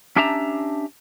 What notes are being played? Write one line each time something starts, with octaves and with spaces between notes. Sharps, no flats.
C#4 D4 G4 E5 A5 A#5